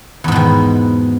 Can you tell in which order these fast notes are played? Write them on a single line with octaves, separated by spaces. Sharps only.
E2 G#2 B2 D#3